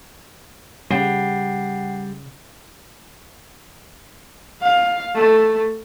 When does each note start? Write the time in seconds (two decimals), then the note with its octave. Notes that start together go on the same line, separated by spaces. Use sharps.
0.91 C#3 G3 F#5 G5 C7
4.62 F5
5.15 A3